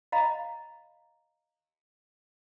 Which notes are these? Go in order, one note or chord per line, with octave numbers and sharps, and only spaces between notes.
D#5 F5 A#5 B5